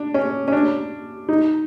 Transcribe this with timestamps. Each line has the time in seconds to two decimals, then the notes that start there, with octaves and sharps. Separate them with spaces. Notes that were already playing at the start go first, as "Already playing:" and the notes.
Already playing: D4
0.14 C#4
0.48 C#4
0.52 D4
1.29 D#4